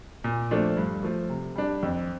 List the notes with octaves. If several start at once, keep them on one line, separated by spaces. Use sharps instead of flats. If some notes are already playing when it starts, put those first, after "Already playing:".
A#2
F3 A3 D4
G2
F3 A3
C3
G3 D4
F2